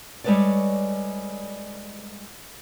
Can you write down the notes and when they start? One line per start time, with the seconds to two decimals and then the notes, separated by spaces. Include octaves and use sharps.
0.24 G3 G#3 A4 B4 C#5 D5